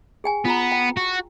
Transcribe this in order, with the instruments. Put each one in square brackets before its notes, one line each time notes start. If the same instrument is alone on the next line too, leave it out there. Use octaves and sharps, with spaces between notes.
[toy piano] G#4 G5 G#5
[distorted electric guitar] B3 [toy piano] F4 A#5
[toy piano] G5
[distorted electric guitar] F#4